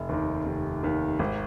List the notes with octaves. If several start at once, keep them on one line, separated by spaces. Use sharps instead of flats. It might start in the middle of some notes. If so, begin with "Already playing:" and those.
Already playing: F1
D#2 D#3
F1
D#2 D#3
G#1